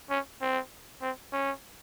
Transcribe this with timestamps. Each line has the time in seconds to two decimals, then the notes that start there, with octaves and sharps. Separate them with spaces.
0.10 C#4
0.41 C4
1.02 C4
1.33 C#4